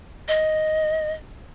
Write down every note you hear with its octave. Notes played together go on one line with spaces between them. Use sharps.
D#5